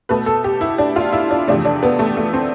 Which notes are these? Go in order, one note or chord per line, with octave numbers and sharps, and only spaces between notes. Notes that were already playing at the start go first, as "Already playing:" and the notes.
B2 A3 B4
A4
G4
E4
D4
F4
E4
D4
E2 C3 F3 A3 D4
D4
B3
A3
A3
C4